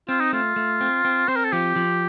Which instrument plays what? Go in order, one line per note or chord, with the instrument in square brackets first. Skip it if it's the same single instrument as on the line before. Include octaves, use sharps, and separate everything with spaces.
[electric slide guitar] C4 [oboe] F4
[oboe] D#4
[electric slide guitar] A3 [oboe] F4
[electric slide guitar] A3
C4
C4
[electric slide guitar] C4 [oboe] C5
[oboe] A#4
A4
[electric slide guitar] F3 [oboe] G4
[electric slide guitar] F3